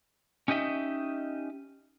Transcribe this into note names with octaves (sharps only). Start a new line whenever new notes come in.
C#4 D#4 G4 D#5 E5